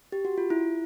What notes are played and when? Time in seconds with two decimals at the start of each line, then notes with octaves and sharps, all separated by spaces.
0.12 G4
0.25 F#4
0.38 F4
0.50 E4